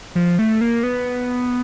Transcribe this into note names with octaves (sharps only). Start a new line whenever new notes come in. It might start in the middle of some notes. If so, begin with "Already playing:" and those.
F3
A3
A#3
B3